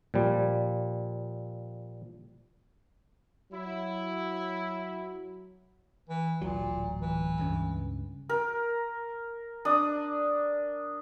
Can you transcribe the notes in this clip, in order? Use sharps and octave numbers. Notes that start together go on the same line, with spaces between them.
A#2 F3 G3
F#3 E4
E3
D1 A1 A#2 F#3
E3
C#2 G2 C#3
A#4
D4 D#6